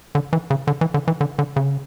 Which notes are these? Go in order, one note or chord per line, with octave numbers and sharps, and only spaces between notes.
D3
E3
C#3
D3
E3
D3
E3
D3
D3
C#3